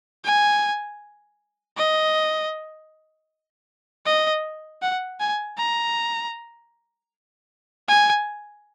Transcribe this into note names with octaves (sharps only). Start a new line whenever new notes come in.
G#5
D#5
D#5
F#5
G#5
A#5
G#5